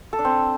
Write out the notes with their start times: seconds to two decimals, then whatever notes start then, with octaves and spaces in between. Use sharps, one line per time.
0.13 A4
0.19 D4
0.25 C4